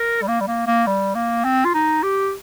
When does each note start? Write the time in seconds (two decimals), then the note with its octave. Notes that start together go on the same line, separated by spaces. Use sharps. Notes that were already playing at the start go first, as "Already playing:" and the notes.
Already playing: A#4
0.22 G3
0.28 A#3
0.41 G3
0.47 A#3
0.66 A#3
0.87 G3
1.15 A#3
1.44 C4
1.65 F4
1.74 D#4
2.03 G4